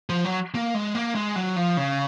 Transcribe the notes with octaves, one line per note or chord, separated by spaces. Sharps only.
F3
F#3
A#3
G#3
A#3
G#3
F#3
F3
C#3